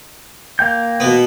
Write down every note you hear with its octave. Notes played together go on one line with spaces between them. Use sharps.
A#3 G5 G6
B2 B3